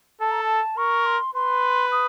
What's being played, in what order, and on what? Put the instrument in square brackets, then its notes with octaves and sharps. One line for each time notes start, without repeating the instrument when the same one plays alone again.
[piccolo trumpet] A4 [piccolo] A5
[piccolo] A#5
A5
[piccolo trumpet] A#4 [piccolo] C#6
[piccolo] C6
[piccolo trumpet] B4 [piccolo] C6
[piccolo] D#6